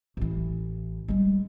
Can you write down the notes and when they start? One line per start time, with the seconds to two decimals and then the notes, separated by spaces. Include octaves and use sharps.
0.17 A1 E3
1.08 G3 G#3